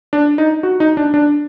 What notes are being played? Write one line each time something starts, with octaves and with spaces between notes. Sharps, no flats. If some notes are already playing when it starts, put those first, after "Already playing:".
D4
D#4
F#4
D#4
D4
D4